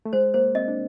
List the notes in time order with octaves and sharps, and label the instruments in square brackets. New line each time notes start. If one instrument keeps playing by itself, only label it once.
[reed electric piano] A3
[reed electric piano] G#3 [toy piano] C5
[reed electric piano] A#3 [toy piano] C5
[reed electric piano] C4 [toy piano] D#5
[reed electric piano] D4